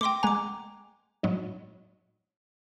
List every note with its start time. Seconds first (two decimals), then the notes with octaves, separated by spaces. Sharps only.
0.01 A3 G5 C6 D6 A#6
0.23 G#3 F#5 G#5 A#5 D6
1.23 A2 F#3 D#4